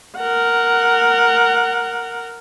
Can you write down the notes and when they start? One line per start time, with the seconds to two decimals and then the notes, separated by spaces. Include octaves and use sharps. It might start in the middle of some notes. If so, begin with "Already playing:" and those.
0.18 A#4 F#5